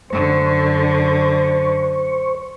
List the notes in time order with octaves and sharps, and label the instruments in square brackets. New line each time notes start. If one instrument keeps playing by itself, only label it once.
[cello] F#2 D3 [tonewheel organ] C5 C#6